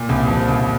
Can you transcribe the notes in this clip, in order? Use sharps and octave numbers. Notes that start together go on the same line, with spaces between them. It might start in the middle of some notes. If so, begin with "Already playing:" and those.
Already playing: A#2
C2
F3
C2